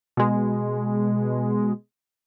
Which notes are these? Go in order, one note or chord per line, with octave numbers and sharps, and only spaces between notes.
B2 G#3